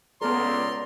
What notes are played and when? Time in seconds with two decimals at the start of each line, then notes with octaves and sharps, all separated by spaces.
0.22 C#2 B3 A4 A#4 D5 A#5 C6